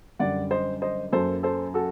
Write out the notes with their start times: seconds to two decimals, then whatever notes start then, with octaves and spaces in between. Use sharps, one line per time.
0.19 F#2 D3 G3 D5 F#5
0.51 C5 D#5
0.82 C5 D#5
1.12 F#2 F#3 A#3 A4 C5
1.43 A4 C5
1.74 F#4 A4